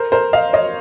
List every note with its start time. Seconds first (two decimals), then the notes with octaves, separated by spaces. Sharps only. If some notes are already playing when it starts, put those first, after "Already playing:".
Already playing: A#4 C5
0.12 A#4 C5
0.33 D#5 F5
0.53 C#5 D#5